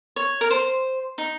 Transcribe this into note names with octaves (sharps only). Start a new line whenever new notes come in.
C#5
A#4
C5
D#4